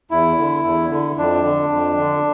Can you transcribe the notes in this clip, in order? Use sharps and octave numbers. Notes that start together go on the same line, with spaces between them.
E2 E4
D3
E2
D3
F2 D4
D3
F2
D3